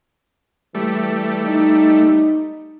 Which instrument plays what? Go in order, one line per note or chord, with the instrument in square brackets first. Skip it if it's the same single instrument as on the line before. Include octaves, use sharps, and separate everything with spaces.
[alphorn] E3 [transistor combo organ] G3 A3
[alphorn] D#4